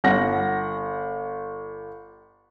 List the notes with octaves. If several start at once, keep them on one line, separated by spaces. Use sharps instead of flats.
G1 F#5 A#6